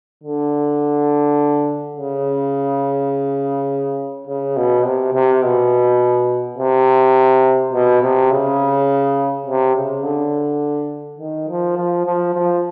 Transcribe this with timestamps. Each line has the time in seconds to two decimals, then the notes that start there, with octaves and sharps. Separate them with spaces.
0.23 D3
1.97 C#3
4.27 C#3
4.56 B2
4.85 C3
5.13 C3
5.42 B2
6.58 C3
7.72 B2
8.02 C3
8.31 C#3
9.46 C3
9.75 C#3
10.04 D3
11.18 D#3
11.48 F3
11.77 F3
12.06 F3
12.34 F3